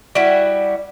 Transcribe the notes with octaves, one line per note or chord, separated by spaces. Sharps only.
G3 E4 F#4